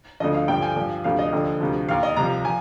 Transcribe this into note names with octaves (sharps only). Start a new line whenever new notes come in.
D2 D3 F3 D#5
F5
G2 D3 F3 G5
G#5
G2 F3
D2 C3 F3 F5
D#5
D#2 D3 F3
D2 C3 F3
D#2 D#3 F5
D#5
C2 C3 F3 A#5
F3 G#5